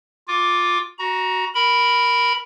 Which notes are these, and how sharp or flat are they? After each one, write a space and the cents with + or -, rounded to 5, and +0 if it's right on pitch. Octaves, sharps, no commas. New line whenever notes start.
F4 +15 D6 -5
F#4 +0 A#5 +25
A#4 +0 B5 +0